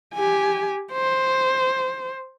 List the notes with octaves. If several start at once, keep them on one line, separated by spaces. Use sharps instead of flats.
G4 G#5
C5